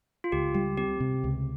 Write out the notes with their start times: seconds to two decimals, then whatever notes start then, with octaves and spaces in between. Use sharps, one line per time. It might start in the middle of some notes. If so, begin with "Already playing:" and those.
0.24 F4
0.32 C#2 G4
0.55 G3 G4
0.78 C4 G4
1.00 C3
1.24 C#2